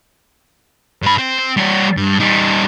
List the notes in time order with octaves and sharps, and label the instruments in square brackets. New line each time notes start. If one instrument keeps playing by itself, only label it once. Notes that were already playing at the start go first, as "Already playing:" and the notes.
[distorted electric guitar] G2 B5
C4
G3 C#5
G2
G3 D#4